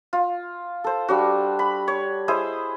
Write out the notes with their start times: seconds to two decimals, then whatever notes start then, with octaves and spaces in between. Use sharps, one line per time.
0.13 F4
0.84 A4 C5
1.08 G3 D4 F#4
1.59 B5
1.88 C#5
2.28 E4 G#4 C5 D#5